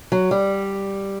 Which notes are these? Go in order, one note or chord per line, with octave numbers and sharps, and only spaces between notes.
F#3
G3